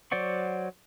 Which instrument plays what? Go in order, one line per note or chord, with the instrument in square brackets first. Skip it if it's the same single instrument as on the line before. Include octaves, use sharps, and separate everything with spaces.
[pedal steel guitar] F#3 C5 D5 F#5 C#6